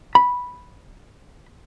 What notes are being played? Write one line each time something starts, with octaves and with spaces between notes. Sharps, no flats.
B5